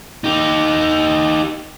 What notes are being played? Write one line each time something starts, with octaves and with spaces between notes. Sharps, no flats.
D#4 G4